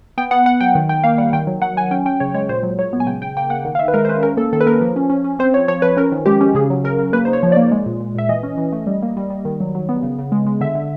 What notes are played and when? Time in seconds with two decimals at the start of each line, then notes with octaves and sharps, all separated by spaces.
0.18 B3 G5
0.31 B3 F#5
0.46 B3 F#5
0.61 F#3 G5
0.75 D#3
0.89 D#3 G5
1.04 A#3 F5
1.18 G3 F#5
1.33 D#3 G5
1.47 F#3
1.62 F#3 F#5
1.77 F#3 G#5
1.91 C#4 G5
2.05 C#4 G5
2.20 C#3 C#5
2.34 G#3 C#5
2.49 A#2 C5
2.63 F#3
2.79 F#3 C#5
2.93 B3
3.00 G#5
3.07 C#3 G5
3.21 C#3 G5
3.37 A#3 G5
3.50 A#3 F#5
3.65 D#3
3.75 F5
3.79 D#3 E5
3.88 B4
3.94 G#3 A#4
4.05 C5
4.09 C#4 B4
4.23 C#4 A#4
4.37 A#3 A4
4.53 D#3 A4
4.61 B4
4.67 A#3 A#4
4.81 F3
4.96 C#4
5.10 C#4
5.24 C#4
5.39 C4 C5
5.53 F3 C#5
5.68 F3 C#5
5.82 F3 B4
5.97 C#4 A#4
6.12 D#3
6.26 G#3 G4
6.41 C#4
6.55 C#3 G#4
6.70 F#3
6.84 C#3 A#4
6.99 C#3
7.13 A#3 B4
7.25 D#4 C5
7.33 C#5
7.43 F3
7.52 A#3 D5
7.72 G#3
7.86 A#2
8.00 A#2
8.15 A#2 E5
8.29 E3 D#5
8.43 C#4
8.58 E3
8.72 A3
8.87 G3
9.02 A#3
9.17 G3
9.30 G3
9.45 D#3
9.60 F#3
9.75 F#3
9.89 B3
10.03 C#3
10.18 C#3
10.32 G#3
10.47 G#3
10.61 D3 E5
10.75 D3